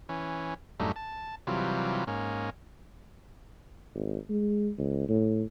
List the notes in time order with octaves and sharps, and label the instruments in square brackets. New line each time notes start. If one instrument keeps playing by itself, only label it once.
[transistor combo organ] E3 C#4
F#2 A2 G3 A3 D4 D#4
A5
C3 E3 F#3 G3 F4
G#2 A#3 C#4
[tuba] G#1
G#3
C#2
A2